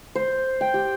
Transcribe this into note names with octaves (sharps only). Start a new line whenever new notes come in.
C5
G5
G4